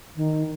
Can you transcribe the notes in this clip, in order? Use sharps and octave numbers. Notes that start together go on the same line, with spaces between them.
D#3